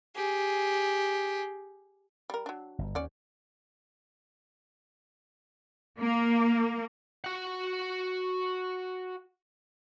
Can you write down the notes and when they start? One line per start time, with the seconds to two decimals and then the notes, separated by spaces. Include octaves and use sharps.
0.16 G4 G#4
2.30 G3 A#4
2.46 F#3 D4
2.79 G1
2.95 D#2 C#4 D5 F#5
6.00 A#3
7.24 F#4 F#5